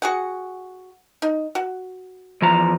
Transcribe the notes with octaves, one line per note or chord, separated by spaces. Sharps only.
F#4 G#4 F#5
D#4
F#4
E2 F3 A#5